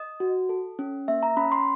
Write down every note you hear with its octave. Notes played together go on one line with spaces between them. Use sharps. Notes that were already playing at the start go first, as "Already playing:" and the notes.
Already playing: D#5
F#4
A4
C#4
A#3 E5
A#5
C#4 B5
C6